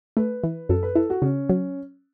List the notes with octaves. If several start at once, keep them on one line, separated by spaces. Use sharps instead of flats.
A3 B4
E3
F#2 A4
B4
E4 A4
F#4
C#3 C#4
F#3